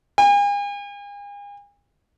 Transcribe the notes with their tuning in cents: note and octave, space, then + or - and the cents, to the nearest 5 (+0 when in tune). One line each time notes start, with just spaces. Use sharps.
G#5 -40